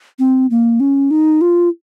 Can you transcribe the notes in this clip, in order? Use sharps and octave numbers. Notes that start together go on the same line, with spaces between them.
C4
A#3
C#4
D#4
F4